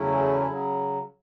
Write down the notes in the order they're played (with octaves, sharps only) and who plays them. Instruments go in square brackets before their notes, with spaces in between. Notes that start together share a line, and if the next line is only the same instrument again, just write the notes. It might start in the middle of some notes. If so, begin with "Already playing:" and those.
Already playing: [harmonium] E2 C#3 F#3 A3 C#4 E4
C#3 F#3